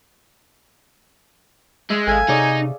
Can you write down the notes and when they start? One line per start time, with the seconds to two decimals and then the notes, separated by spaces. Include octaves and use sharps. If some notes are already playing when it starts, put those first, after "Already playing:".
1.90 G#3 E5
2.07 G#1 A4 E5 F5 G#5
2.29 C3 D#4 G#4 C#5 D5